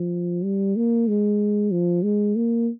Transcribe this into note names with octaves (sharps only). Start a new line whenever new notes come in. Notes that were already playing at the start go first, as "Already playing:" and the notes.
Already playing: F3
G3
A#3
G#3
F3
G#3
A#3